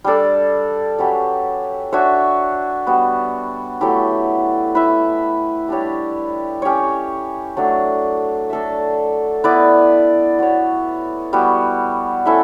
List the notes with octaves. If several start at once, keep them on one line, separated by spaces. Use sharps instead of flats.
G3 D4 A4 D5
F#3 C#4 G4 B4
D4 F#4 C#5 E5
G3 B3 F#4
F#3 A3 E4 G4
E4 B4 E5
G3 D4 G4 C#5
C#4 G4 C#5
F#3 A3 D4
D4 A4 E5
B3 E4 B4 D5
B3 F#4 C#5
G3 B3 F#4
C#4 E4 A4 E5